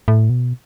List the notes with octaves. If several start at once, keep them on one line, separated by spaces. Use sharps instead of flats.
A2
B2